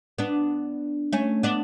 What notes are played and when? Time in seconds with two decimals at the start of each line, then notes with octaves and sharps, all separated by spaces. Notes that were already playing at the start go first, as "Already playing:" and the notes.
0.19 B3 D4
1.13 A3 C#4
1.43 B3 D4